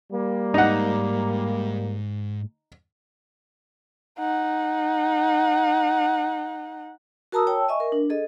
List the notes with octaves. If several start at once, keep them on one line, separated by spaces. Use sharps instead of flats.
G3 A#3
G#2 D#4 F#5
D#4 F#5
F#4 A#4 A5 A#5 D#6 E6
C#5 G5 A5 E6
D#5 E5 G#5 C#6
A#4
D4
G#4 A4 D#5